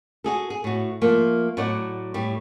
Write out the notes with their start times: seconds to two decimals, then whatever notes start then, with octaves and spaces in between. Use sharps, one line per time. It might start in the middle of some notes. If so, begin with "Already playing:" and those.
0.24 F#4 G#4 A4
0.50 G#4
0.64 A2 F#4
1.01 F3 A3 A#3
1.57 A2 F#3 A4 D5 F#5
2.14 A2 G3